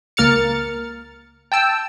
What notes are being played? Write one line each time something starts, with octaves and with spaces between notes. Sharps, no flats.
C#2 A#3 A#4 F6 A6 C#7
G5 A5 E6